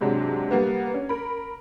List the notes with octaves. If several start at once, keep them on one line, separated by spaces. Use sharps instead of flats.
G#2 C3 F#3 G#3 D4
G3 A#3 B3
C#4
A#4 B5